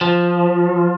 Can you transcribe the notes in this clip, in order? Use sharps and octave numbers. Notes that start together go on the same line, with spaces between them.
F3